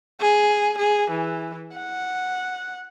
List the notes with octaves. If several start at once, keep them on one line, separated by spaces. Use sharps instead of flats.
G#4
G#4
E3
F#5